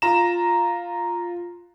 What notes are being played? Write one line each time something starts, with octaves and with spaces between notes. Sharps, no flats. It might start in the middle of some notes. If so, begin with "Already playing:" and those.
F4 A#5 E7